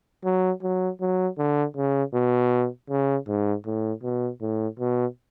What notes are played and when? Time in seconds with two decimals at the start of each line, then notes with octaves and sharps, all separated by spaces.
0.25 F#3
0.63 F#3
1.01 F#3
1.38 D3
1.77 C#3
2.14 B2
2.90 C#3
3.28 G#2
3.66 A2
4.03 B2
4.41 A2
4.79 B2